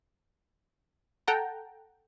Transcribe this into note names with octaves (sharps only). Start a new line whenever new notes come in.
A4 F#5 G5 A5 A#5